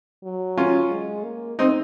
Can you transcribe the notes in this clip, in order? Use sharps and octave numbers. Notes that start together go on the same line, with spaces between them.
F#3
C#4 F4
G#3
A#3
C4 D#4